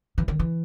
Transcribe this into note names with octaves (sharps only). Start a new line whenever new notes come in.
E3
D#3
E3